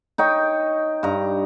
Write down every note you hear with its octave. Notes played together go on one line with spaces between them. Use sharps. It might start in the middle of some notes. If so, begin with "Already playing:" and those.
D#4 C#5 G5
G2 A#5